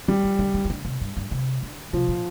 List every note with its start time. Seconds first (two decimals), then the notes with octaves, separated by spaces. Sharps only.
0.08 F3 G3
0.24 F3
0.39 D3
0.54 D3
0.65 F3
0.70 D3
0.85 C3
1.01 G2
1.17 G2
1.31 C3
1.63 D3
1.93 C3 F3
2.08 A#2